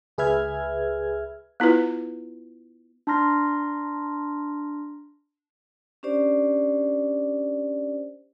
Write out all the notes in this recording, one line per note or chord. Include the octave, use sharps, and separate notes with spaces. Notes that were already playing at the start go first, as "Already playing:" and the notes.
C#2 G#4 B4 E5 F6 G#6
B3 E4 F4 B4
D4 A5 A#5 C6 F6 A#6
C#4 D4 G4 C5 D5